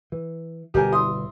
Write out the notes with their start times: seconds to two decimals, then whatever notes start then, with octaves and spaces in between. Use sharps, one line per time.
0.12 E3
0.74 G1 B2 G4 A#4 G#5
0.92 E4 C6 D#6